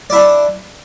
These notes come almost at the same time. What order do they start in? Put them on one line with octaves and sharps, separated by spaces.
D5 E4 D4